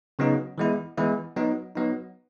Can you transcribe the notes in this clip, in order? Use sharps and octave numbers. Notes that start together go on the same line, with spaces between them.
C#3 F#3 B3 D#4
E3 G#3 B3 E4
E3 G#3 B3 E4
F#3 B3 D#4
F#3 B3 D#4